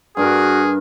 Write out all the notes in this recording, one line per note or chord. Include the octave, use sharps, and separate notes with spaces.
G2 D4 F#4 G#4 A#4